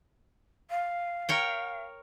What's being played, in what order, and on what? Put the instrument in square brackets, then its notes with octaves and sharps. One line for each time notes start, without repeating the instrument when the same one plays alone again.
[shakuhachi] F5
[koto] A#4 C#5 G5